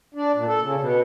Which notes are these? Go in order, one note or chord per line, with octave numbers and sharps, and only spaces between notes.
D4
A#2
A4
C#3
B2